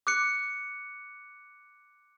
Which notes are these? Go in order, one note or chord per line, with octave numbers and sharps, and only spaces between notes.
D6 F#6 C#7